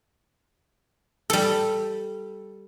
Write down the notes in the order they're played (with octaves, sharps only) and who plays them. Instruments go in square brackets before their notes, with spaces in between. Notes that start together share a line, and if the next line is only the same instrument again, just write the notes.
[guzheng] G3 A4